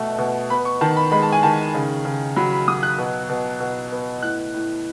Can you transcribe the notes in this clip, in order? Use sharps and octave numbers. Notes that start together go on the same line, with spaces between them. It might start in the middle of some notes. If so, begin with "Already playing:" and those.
Already playing: B2 A3 F#5
B2
B3 B5
C#6
D#3 A5
B5
G#3 B5
A5
G#5
D#3 A5
C#3
C#3
F#3 B5
B5
F#3 D#6
F#6
B2
B2
B2
B3
A2 F#6
A2